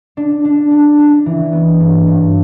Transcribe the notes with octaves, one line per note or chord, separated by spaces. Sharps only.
D4
D4
D4
D4
E3
B3
G2
G2